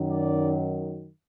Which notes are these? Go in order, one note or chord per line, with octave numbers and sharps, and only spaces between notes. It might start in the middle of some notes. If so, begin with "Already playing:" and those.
Already playing: F#2 D#3 F#3
D5